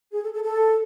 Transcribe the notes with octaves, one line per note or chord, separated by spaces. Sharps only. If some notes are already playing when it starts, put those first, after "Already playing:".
G#4
A4
A4
A4